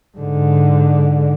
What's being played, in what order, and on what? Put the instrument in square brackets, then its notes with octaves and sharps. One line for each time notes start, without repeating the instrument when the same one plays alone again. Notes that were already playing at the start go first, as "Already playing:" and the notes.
[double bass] G#2 D3